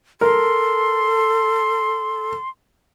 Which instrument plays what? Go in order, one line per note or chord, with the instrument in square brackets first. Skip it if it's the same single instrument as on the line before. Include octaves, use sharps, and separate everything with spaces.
[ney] A4 [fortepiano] A#4 [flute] C6